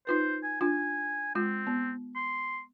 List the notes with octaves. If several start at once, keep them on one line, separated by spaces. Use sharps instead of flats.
D#4 F4 B4 C5
G#5
D4 F4 G#5
G#3 C4 F4
B3
C6